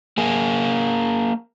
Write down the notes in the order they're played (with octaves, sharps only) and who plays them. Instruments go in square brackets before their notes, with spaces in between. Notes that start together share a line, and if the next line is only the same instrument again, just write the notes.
[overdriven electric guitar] A#3 G#4